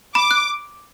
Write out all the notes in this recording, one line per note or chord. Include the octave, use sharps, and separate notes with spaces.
B5 D6
F#6